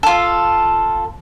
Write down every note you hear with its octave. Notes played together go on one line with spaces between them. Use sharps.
F4 A4